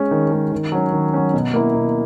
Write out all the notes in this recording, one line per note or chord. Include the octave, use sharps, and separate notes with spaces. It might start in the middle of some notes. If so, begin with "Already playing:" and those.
Already playing: G#3 C#4
D#3
G#3 C#4
D#3
F#3 C#4
D#3
F#3 C#4
B2
A#3 E4
B2